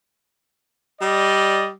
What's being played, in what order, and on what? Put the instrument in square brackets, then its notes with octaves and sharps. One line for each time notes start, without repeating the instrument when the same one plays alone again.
[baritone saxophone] G3 [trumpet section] D5 D#5